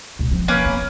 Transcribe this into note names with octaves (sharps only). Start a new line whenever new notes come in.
C#2 B2
F3 C4
A#3 C#4 B4
B3